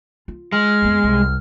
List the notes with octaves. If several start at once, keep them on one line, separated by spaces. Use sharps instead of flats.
F4
G#3 F6
F2 B3
C2